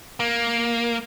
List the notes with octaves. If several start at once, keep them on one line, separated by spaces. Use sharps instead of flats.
A#3